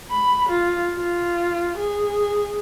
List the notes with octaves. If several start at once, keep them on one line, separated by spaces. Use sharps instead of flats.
B5
F4
F4
G#4